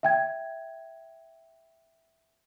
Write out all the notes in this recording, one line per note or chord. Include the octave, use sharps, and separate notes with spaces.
E5 G5 G#6